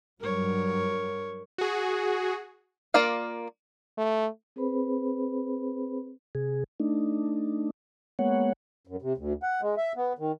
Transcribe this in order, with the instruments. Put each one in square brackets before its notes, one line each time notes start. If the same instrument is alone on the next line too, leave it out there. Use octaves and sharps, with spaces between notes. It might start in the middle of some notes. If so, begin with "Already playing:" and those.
[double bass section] G2 F#3 [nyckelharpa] A#4 C#5
[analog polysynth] F#4 G#4
[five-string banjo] A#3 F4 A#4 D5 F5
[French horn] A3
[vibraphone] C4 G#4 B4 C5 B5
[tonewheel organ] C3 G#4
A3 D4 D#4
G#3 A#3 B3 C#5 F#5
[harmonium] F#2
C3
D2
F#5
G#3
E5
B3
D#3